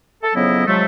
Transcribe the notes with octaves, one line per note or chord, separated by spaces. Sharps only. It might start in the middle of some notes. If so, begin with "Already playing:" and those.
A4
F2 C#3 F#3 B3 E4 D#5
C3 F3 F#3 G#3 A3